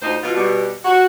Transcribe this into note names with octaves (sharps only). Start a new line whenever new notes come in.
D2 D#4 F4 C5
B2 F4
B2 G3
F#4